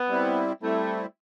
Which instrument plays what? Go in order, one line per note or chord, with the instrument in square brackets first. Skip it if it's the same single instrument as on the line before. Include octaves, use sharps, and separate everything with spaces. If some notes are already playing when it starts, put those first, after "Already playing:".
Already playing: [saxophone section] B3
[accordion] G3 C4 E4
[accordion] G3 C4 E4 [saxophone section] A3